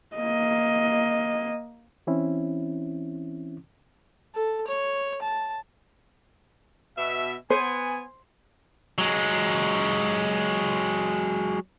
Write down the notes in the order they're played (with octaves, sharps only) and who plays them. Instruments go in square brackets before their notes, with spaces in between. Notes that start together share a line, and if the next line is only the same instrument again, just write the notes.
[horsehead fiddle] A#3 D#5
[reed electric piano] E3 C4 C#4 E4
[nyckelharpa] A4
C#5
A5
[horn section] B2 E5
[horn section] B3 G#5 [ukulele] C5
[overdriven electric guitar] F#3 G#3